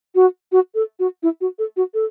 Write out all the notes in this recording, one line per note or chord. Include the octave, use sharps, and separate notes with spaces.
F#4
F#4
A4
F#4
E4
F#4
A4
F#4
A4